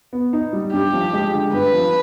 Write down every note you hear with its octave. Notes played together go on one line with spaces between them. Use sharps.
B3
D#4
G3
G2 G4
F3
G#3
D3
G2 B4
F3